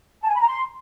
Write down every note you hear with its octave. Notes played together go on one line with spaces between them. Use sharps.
A5
G#5
B5
A#5
C6